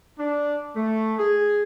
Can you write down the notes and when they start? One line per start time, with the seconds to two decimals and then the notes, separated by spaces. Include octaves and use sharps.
0.19 D4
0.76 A3
1.18 G#4